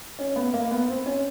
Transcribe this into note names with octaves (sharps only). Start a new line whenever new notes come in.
C#4
B3
A#3
B3
C4
C#4